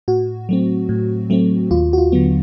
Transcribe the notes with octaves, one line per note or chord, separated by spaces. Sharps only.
A2 F#4
F#3 A3 C4
A2
F#3 A3 C4
D#2 F4
F#4
F4
D3 F#3 B3